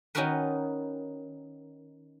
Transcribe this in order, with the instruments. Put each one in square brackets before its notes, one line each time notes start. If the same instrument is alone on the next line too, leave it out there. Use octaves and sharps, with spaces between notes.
[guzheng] D#3 C#4 D#4 F#4 A#4 B4